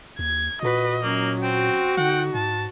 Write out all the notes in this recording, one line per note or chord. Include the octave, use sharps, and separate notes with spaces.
D#2 G#6
A#2 F#4 B4 D#5
F#3 A#3 C#4
C4 F#4 G5
D3 D#4 F#5 G5
G#2 A5